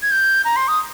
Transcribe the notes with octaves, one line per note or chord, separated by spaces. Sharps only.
G#6
G6
A#5
C6
D#6